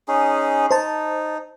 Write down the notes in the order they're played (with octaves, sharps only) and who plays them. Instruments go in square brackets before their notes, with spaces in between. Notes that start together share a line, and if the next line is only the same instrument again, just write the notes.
[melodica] C#4 D#4 G#4
[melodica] D#4 [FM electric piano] C5 A5